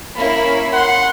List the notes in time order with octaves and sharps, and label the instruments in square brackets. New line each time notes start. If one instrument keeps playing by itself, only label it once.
[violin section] A#3 C#4 E4 [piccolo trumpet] B5
[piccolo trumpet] F#5 [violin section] C6